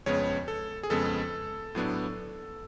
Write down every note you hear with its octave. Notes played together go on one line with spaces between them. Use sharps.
F2 C#3 G#3 B3 C#5
A4
G#4
F2 C#3 G#3 B3 A4
A2 F#3 B3 D4